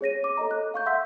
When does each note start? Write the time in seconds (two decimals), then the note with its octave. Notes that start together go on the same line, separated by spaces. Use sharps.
0.01 G#4 C#5 A#6 D#7
0.24 D6
0.37 A4 C#5 D#5 A#5
0.51 F#6
0.74 F5 C#6 G6
0.86 E5 F#5 C6 E6 G6 B6